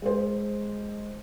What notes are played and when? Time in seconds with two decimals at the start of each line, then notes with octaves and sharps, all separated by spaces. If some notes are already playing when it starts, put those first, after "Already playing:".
0.02 G#3 C5